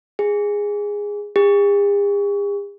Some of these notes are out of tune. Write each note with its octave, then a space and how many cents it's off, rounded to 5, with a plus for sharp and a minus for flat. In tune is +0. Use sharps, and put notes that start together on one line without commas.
G#4 -10
G#4 -45